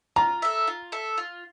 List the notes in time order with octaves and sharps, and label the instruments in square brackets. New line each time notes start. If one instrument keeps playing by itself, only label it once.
[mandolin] F4 [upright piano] A#5
[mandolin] A4 E5
F4
A4 E5
F4